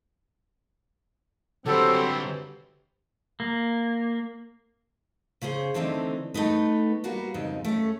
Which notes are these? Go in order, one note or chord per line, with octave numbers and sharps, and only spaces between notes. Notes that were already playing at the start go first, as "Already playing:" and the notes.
D3 F#3 C4 G4 A4 B4 C5
A#3
C#3 C#4 G#4 C5
D3 E3 A3 C4 D4 D#4
A3 B3 D#4 B4
G3 A#3 F#4 B4
F2 G#2 C#3 D#4
A3 C#4